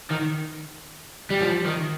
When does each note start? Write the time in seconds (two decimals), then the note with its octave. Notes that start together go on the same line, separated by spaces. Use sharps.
0.10 D#3
1.30 G3
1.41 F3
1.66 D#3